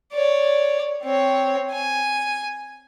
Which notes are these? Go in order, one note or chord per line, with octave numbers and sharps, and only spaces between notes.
C#5 D5
C4 C#5
G#5